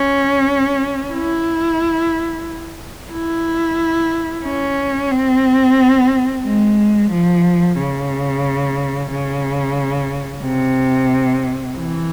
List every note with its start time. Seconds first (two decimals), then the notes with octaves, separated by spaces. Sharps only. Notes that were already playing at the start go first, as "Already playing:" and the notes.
Already playing: C#4
1.13 E4
3.12 E4
4.45 C#4
5.11 C4
6.45 G#3
7.11 F3
7.77 C#3
9.10 C#3
10.43 C3
11.77 E3